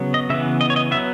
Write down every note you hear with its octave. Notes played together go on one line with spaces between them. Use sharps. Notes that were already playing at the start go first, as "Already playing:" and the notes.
Already playing: C#3 F#3 B3
D#5
C#3 E3 B3 E5
D#5
C#5
D#5
F#3 B3 E5